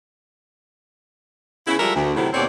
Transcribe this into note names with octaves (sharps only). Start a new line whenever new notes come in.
C#3 B3 E4
F3 G3 G#3 A4 A#4 E5
D2
A2 C3 D#3 F#3 E4
D#2 B2 C4 C#5 D5